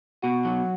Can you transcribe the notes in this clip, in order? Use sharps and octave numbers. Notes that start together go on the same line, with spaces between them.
B2 F#4
F#3